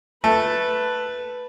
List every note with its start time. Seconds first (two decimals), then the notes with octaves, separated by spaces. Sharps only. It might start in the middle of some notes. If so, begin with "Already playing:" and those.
0.24 A3 B4